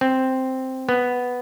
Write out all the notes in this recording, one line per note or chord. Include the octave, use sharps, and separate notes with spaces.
C4
B3